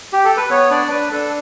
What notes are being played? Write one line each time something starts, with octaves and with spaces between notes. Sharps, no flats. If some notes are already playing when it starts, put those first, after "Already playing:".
G4
A4
B4
B3 C#5
D4 D5
D4 B4
D4 A4